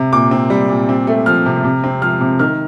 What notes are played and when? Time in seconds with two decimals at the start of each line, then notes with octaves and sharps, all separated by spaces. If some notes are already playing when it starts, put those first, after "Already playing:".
Already playing: C3
0.12 A#2 D6
0.31 C4
0.50 G3
0.69 A#2
0.89 C4
1.07 A3
1.26 F3 F6
1.46 C3
1.64 C3
1.84 C4
2.02 F3 F6
2.21 C3
2.39 D#3 F6